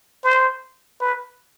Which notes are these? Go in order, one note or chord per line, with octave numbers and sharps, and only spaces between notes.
C5
B4